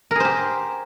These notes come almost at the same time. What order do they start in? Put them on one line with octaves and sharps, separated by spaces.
A#4 G#4 C5 G4